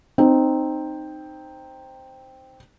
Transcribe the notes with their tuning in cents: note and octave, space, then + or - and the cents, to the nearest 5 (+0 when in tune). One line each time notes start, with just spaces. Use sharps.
C4 +0 D#4 -15